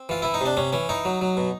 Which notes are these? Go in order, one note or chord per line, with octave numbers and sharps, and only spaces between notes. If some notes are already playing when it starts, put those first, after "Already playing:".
Already playing: C4
E3 F4
E3 E4
D#4
C3 D4
C3 C#4
E3 C#4
E3 D#4
F#3
F#3
B2